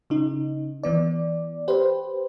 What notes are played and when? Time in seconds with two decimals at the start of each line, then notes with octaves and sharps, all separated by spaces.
0.10 C#3 D#4
0.83 E3 B3 D5
1.68 G4 B4 C5